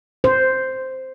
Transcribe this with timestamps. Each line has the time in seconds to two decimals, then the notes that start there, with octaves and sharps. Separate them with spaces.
0.24 C5